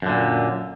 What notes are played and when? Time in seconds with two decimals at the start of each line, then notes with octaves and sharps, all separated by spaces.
0.02 F#2
0.06 D3
0.09 A#2